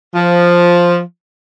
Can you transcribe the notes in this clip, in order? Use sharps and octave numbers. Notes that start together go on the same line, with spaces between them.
F3